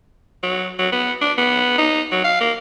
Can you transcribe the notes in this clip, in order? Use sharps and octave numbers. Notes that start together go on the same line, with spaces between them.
F#3
F#3
B3
D4
B3
D#4
F#3
F5
A#3